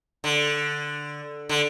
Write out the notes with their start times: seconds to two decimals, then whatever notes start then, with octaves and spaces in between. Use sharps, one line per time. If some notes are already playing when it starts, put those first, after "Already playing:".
0.24 D3
1.49 D3